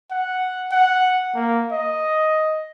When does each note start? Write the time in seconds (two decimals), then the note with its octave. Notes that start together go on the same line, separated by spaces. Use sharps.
0.11 F#5
0.71 F#5
1.34 A#3
1.71 D#5